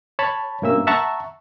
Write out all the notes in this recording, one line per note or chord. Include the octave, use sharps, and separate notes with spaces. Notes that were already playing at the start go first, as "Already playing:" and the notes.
C#5 A5 B5
G2 B2 A#3 C#4 E5 E6
E5 F#5 A5 A#5 C#6